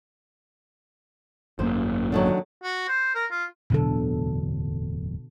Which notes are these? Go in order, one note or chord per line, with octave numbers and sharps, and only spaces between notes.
G#1 F#2 A#3 C5
D3 D#3 F#3
F#4
C5
A#4
F4
D1 E2 B2 D3 F#3 A4